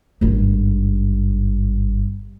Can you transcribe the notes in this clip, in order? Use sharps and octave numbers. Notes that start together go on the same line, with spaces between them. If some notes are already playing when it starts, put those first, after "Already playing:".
G#1 G2